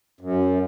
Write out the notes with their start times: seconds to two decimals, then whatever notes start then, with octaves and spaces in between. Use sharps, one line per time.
0.21 F#2